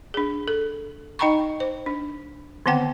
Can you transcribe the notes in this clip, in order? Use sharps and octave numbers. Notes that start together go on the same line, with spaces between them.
D4 G#4
A4
D#4 D#5 G5 A#5 B5 C#6
C5
D4
D3 D#3 B3 C4 F#5 G5